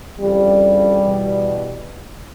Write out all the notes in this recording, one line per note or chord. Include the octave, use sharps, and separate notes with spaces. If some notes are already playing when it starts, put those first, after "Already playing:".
F2 C#3 E3 G3
E2 B2